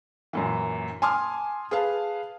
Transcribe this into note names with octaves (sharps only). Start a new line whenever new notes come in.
F#2 A#2 E3
G#5 A5 C6 D6 D#6 F6
G#4 B4 F5 A5